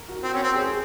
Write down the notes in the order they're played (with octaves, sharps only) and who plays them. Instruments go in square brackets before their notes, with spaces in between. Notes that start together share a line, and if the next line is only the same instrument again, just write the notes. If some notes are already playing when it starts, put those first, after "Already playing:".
Already playing: [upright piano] A#4
F#4
[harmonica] C4
C#4
C4
[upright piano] G#4